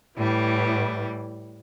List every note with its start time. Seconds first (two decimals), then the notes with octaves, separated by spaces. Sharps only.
0.18 A2 E3 G3